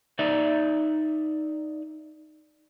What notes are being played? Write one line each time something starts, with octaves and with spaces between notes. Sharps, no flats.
D#4 D5 E5